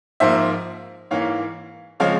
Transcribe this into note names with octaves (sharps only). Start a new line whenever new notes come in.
G#2 F3 A#3 C5 E5
G#2 E3 A#3 C#5 F5
C#3 F3 G#3 C4 C#5 F5